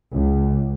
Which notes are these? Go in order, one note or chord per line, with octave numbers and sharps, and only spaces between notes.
C#2